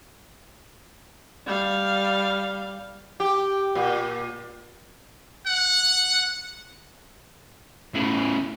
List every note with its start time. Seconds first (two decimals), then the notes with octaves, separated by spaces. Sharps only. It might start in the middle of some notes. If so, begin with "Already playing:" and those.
1.46 G3 F5
3.20 G4
3.75 A#2
5.46 F#5
7.94 A2 C#3